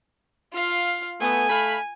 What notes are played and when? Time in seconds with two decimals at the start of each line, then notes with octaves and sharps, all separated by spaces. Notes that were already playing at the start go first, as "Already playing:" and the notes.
0.53 F4 F5
1.20 A3 B3 G#5
1.49 A3 F5 B5